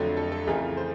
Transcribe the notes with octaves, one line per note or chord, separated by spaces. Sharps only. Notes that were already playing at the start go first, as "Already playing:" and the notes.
Already playing: F2 D3 F#3 A3
A4
A4
F2 C#3 E3 A3 A#4
C5